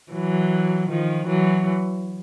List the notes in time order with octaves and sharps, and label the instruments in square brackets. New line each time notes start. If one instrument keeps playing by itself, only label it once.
[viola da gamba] E3 F#3
D#3 F3
E3 F#3